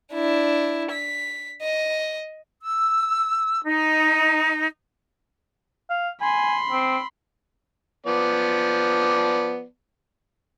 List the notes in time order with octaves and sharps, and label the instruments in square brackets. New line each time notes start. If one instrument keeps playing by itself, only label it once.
[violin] D4 E4
B6
D#5
[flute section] E6
D#4
[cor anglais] F5
[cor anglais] G#5 [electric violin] B5 C6
[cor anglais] C4
[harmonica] F3 B3 D5